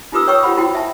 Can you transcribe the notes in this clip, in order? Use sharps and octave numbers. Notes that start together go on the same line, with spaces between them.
D#4 F4 G4 B4 D#6 E6
B4 C#5 G5 C#6 E6
F4 G4 C5 F#5 B5
E4 F#4 G5
E5 A5